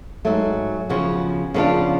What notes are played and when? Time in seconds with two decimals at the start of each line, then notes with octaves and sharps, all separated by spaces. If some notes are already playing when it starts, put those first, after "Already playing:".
0.25 G#2 F#3 A3
0.89 C#3 F3 B3 F#4
1.54 C#3 F3 B3 D4 F4